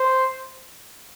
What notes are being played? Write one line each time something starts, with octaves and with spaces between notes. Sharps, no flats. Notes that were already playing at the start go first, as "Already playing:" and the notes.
Already playing: C5